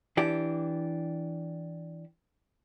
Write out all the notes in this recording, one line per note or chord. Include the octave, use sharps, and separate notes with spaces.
E3 D4 G4